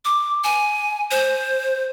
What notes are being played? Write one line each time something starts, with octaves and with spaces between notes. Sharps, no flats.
D6
G#5
C5